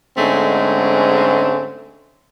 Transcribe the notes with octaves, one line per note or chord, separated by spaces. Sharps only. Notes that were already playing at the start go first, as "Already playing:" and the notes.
G#2 D3 G#3 A3 C4 C#4